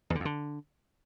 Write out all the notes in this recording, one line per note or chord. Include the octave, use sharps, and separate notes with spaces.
E2
D3
F2
D3